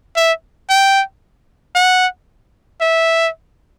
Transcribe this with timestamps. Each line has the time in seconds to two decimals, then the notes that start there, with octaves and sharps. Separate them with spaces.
0.16 E5
0.70 G5
1.75 F#5
2.81 E5